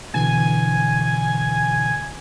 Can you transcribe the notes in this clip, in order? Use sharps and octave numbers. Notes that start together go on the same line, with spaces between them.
B2 D3 E3 G#5